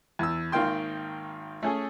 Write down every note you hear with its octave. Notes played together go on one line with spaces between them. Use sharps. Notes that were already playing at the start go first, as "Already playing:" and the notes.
E2 E6
G#1 D#3 A#3 F5 G5 C6
A3 C#4 G#4